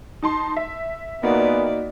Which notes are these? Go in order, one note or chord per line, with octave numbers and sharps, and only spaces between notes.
D#4 A5 C6
E5
A#2 A#3 B3 D#4 F#4 D5